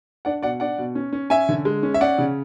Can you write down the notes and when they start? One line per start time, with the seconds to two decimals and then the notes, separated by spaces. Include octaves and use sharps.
0.25 D4 D5 F#5
0.42 B2 D5 F#5
0.60 D4 D5 F#5
0.78 B2
0.95 C#4
1.13 C#4
1.30 C#4 E5 G#5
1.49 D3
1.65 G#3
1.83 C#4
1.94 E5
2.01 C#4 D5 F#5
2.18 C#3